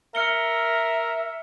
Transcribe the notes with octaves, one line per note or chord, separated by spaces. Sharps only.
A#4 E5 F6 C#7 G7